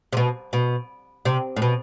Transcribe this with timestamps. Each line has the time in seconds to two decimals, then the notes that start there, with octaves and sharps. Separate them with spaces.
0.13 C3
0.17 B2
0.53 B2
1.25 C3
1.56 A2
1.62 B2